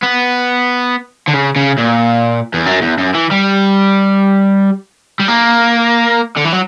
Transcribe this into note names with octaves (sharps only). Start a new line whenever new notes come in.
B3
D3
C#3
C#3
A#2
E2
F#2
E2
F#2
E3
G3
G3
A#3
D3
E3
F#3